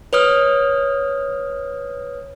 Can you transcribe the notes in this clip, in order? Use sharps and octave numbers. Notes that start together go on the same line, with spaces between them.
B4 C#5 D#6 F6